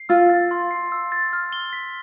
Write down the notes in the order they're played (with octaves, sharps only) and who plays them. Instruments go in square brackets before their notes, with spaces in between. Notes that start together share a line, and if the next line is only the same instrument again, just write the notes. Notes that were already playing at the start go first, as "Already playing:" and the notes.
Already playing: [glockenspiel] C7
[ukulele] F4 [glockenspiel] E6
[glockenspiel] A6
C6
C7
E6
A6
F6
G7
B6